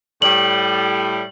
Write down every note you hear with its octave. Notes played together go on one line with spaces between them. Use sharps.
A2 G3 F#7